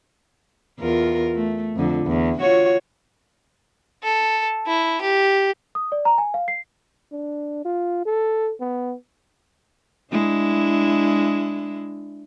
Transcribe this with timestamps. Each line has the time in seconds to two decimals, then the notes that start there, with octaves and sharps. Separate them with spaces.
0.79 E2 F4 A#4
1.35 A3
1.76 F2 D3
2.06 E2
2.41 F4 F#4 C#5
4.03 A4
4.67 E4
5.01 G4
5.75 D#6
5.92 D5
6.05 A#5
6.18 G#5
6.34 F5
6.48 C7
7.12 D4
7.65 F4
8.06 A4
8.61 B3
10.11 G#3 D4 E4